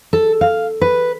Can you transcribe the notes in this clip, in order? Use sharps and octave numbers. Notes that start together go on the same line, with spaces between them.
A4
F5
B4